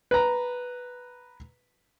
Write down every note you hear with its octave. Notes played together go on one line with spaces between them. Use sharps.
B4 A#5